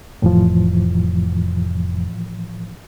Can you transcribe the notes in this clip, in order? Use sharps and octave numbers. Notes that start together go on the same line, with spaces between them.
F1 A2 E3 F3